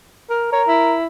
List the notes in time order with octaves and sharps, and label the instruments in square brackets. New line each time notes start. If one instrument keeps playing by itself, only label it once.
[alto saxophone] A#4
[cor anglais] A#4 [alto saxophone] C#5
[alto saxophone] E4